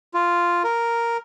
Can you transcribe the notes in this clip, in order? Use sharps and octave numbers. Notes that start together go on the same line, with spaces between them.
F4
A#4